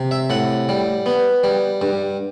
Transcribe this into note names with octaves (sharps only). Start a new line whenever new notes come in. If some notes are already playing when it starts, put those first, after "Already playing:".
Already playing: C3
E5
A2 F#5
G3
B3
G3
G2